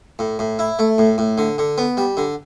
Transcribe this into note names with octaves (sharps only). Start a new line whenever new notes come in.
A2
A2
E4
A3
A2
A2
D3
D3
B3
G3
D3